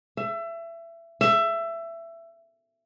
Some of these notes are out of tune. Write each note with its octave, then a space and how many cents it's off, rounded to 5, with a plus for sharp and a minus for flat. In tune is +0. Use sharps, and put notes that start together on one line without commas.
E5 +25
E5 +20